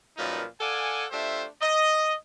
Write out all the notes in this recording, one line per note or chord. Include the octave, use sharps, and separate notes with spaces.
F#2 A#2 F3 G3 D#4 B4
A4 D5 F5 F#5 G#5
A3 D4 F4 G4 C5 E5
D#5